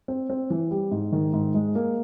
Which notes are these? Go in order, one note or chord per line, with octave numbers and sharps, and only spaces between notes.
C4
C4
E3
G3
G#2
D#3
G#2
G#3
A#3